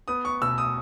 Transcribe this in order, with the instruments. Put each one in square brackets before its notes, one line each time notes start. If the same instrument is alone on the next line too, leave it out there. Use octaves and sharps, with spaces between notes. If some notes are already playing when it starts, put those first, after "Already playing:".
[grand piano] B3 D#6
C#6
B2 E6
D#6